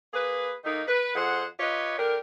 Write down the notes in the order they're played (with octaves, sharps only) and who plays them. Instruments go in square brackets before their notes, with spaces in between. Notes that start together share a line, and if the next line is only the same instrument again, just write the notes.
[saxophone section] A#3 G#4 B4
D#3 A3 A#3 D#4
B4
F2 G#4 C5 F#5
F4 G4 B4 C#5 D#5
D3 D4 G4 A#4